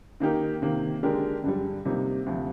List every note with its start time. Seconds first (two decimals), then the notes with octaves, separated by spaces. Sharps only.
0.20 D#3 A#3 D#4 G4 A#4
0.62 C3 D#3 A#3
1.03 D3 G#3 D4 G4 A#4
1.44 G2 D3 G3
1.85 C3 G3 A#3 D#4
2.26 D2 C3 F3